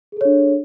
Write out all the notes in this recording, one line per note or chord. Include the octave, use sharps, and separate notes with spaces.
D4 G#4 A4 C#5